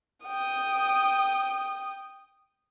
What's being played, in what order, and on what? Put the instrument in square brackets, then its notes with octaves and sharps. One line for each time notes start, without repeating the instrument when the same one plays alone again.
[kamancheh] G5 D#6